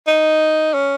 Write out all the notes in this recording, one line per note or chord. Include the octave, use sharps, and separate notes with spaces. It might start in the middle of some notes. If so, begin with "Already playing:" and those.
D#4
C#4